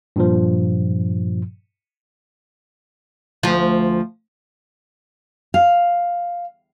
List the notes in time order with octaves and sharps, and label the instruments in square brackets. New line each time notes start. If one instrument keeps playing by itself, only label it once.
[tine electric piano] G2 A#2 F3
[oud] D2 F3
[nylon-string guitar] F5